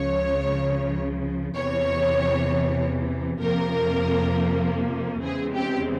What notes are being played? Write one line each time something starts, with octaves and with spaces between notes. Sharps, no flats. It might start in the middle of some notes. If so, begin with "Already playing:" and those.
Already playing: C#2 C#3 F3 C#5
E2 C3 E3 C#5
F2 C3 F3 A#3 A#4
E2 C#3 E3 G#3 C4 G#4
G4